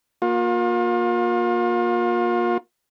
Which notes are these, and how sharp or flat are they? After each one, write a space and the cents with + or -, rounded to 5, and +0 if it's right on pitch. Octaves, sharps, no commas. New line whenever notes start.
A#3 +20 F4 +35